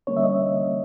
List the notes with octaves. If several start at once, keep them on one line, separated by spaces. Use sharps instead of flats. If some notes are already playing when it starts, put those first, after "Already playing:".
D3 G3 A#3 C#4 C#5
E5
D#5